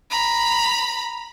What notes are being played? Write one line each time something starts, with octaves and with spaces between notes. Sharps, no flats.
A#5 B5